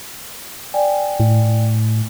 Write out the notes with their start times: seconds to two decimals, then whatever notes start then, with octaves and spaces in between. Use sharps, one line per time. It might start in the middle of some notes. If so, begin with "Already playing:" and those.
0.74 D5 G5 G#5
1.20 A2